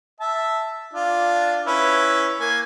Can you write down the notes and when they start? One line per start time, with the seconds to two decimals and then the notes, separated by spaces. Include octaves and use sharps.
0.20 E5 A5
0.93 D4 F4
1.67 C#4 E4 B4
2.40 A#3 G#5